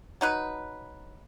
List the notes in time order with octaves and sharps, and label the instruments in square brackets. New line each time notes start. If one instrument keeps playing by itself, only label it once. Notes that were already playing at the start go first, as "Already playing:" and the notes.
[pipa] F#3 D#4 B4